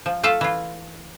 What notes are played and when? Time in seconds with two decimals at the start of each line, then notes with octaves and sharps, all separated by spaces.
0.06 F3
0.23 A3 F4 A4
0.41 E3 F4